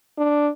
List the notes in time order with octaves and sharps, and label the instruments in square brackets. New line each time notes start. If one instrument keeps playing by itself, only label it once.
[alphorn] D4